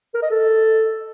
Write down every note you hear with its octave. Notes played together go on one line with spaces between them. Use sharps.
A#4
D#5
A4